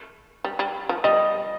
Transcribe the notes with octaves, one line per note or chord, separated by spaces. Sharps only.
G3
G3
F3
G3 D#5